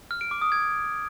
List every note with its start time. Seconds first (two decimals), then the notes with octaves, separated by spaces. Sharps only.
0.11 F6
0.21 D7
0.31 D6
0.42 D#6
0.52 G#6